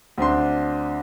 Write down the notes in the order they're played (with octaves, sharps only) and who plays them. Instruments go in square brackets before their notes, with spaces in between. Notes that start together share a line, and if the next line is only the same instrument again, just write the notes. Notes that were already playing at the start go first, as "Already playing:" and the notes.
[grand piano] D2 C4 D4 C6